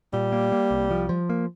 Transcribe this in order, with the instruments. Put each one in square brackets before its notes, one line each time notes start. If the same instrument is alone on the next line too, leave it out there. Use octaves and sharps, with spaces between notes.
[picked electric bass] A#2 [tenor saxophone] G3
[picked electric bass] A#3
A#3
C2
F3
F3
A#3